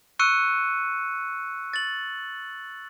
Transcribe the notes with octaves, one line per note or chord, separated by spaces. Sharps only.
C#6 E6 F#6 C#7 D#7
A6 F#7